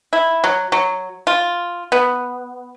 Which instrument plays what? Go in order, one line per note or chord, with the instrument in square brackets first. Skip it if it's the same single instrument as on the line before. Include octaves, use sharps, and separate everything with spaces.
[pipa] E4
F#3
F#3
F4
B3